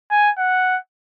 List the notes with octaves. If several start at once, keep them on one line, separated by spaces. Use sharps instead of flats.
G#5
F#5